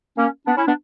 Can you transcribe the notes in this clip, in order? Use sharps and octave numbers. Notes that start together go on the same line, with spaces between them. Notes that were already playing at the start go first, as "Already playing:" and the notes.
A#3 C#4
B3 D4
C#4 E4
B3 D4